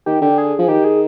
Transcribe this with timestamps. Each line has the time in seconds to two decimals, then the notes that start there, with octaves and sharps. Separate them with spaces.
0.06 D#3 G4
0.21 D3 G4
0.38 G#4
0.59 F3
0.68 D#3 G4
0.84 G#4